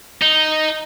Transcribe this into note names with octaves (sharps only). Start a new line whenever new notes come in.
D#4